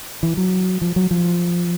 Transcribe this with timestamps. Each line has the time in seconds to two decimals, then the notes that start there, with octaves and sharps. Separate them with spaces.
0.23 E3
0.37 F#3
0.82 F3
0.96 F#3
1.11 F3